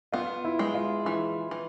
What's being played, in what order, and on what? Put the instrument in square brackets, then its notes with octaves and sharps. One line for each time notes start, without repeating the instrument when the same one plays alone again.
[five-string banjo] B3 [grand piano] F4
[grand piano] E4
[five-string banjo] G#3
[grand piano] F4
[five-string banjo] E3 [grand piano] E4
[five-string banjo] E3